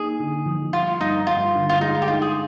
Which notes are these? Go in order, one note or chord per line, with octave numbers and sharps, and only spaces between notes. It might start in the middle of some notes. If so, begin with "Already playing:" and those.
Already playing: A#3 D#4 G#4
D3
F3
G3 F4
G2 D#4
G2 F4
D3
F4
G#3 D#4
F4
G4
D#4 F4
G#4